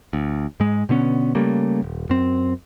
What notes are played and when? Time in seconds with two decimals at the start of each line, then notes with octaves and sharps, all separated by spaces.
0.13 D2
0.60 G#2 G#3
0.89 B2 D3 B3 C#4
1.35 C#3 G3 A3 A#3
1.82 D#1
2.09 F#2 C4